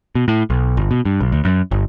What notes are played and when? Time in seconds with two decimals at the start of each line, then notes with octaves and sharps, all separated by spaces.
0.15 B2
0.28 A2
0.50 B1
0.77 G1
0.91 B2
1.05 G2
1.20 B1
1.32 D2
1.45 F#2
1.71 G1